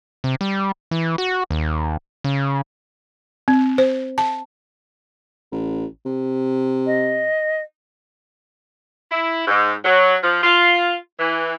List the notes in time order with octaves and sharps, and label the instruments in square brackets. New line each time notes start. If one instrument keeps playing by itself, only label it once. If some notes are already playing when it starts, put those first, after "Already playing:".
[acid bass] C3
G3
E3
F#4
D#2
C#3
[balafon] C4
C5
A5
[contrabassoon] A1
C3
[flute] D#5
[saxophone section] E4
G#2
F#3
F3
F4
E3